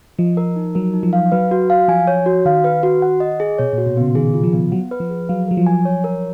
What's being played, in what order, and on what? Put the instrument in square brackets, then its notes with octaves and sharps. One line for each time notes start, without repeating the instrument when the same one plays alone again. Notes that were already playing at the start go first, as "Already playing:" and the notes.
[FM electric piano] F3 [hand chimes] D#5
[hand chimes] A#4
D#4
[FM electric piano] F#3 [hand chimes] A#4
[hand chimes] D#4
[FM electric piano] F3
[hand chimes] F5
[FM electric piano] F#3 [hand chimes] B4
[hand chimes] F#4
F5
[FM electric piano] F3 [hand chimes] G#5
[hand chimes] C#5
F#4
[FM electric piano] D#3 [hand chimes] F5
[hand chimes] B4
F#4
F#5
D#5
G#4
[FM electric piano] B2 [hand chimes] C#5
[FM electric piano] A#2
[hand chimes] F#4
[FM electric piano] B2
[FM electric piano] C#3 [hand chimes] B3
[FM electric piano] D#3 [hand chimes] G#4
[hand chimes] F4
[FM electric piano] F3
[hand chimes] B3
[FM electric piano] F#3 [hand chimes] F#5
[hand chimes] B4
[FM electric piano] F3
[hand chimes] G#4
[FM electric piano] F#3 [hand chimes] F5
[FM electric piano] F#3 [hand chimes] A#4
[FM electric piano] F3
[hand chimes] G#5
C#5
A#4